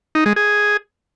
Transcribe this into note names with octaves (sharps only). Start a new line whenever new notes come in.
D#4
G#3
G#4